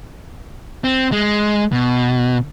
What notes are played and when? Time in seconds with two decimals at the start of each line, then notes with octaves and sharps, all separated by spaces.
0.84 C4
1.12 G#3
1.72 B2